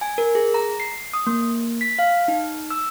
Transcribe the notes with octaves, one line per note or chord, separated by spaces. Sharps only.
G#5
A#4
G#4
A#5
C7
D#6
A#3
B6
F5
D#4
E6